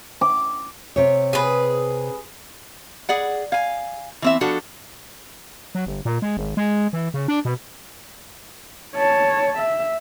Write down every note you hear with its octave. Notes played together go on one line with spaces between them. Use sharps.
D6
C3 C#5
G#4 B4
G#4 D5 F#5
F5 G#5
E3 C4 E5
F3 D4 F#4 A4
F#3
G1
A#2
G#3
G#1
G#3
E3
C#3
D4
B2
C#5 A5
E5